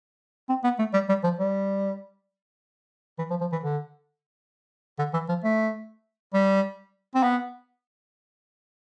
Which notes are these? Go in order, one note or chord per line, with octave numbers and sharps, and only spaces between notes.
C4
B3
A3
G3
G3
F3
G3
E3
F3
F3
E3
D3
D3
E3
F3
A3
G3
C4
B3